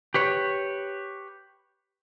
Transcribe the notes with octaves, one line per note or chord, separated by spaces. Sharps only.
G4 B4 C#5